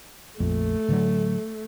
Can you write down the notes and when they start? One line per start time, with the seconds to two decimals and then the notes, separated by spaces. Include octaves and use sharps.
0.40 A#1 F2 A3
0.88 A2 D3 F#3